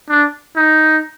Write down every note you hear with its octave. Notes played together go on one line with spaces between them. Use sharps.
D4
D#4